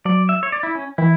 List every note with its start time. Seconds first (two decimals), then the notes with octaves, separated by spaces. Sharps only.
0.05 F#3 D5
0.29 E5
0.43 C#5
0.52 D5
0.63 E4
0.75 C#4
0.98 E3 E4